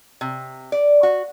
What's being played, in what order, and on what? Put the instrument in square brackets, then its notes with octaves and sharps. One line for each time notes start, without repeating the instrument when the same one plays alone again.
[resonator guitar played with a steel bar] C3
D5
F#4